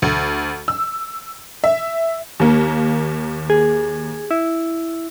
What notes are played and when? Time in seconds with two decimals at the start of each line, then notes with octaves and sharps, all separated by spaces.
0.02 D2
0.68 E6
1.64 E5
2.40 D#2 A#3
3.50 G#4
4.31 E4